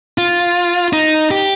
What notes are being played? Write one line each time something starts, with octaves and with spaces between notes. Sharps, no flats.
F4
D#4
G4